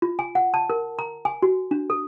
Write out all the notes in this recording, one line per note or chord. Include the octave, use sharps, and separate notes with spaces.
F4
G#5
F#5
A5
A#4
A#5
G#5
F#4
D4
A4